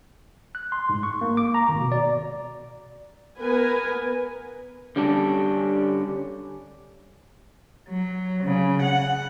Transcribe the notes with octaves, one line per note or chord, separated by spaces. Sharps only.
F#6
C6
G#2
C#6
A#3
D6
A#5
G#1
B2
D5
B3 A#4 B4 G#5
D3 G3 C#4 D4
F#3
C#3
F#5